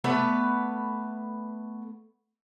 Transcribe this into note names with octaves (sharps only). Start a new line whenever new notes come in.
A3 B3 B4 D5